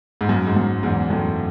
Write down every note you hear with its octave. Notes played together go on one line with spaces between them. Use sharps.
G#2
F#2
G#2
F#2
E2 G#2
F#2 A2